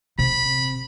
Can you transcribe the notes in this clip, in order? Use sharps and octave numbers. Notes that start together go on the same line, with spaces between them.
C3 B5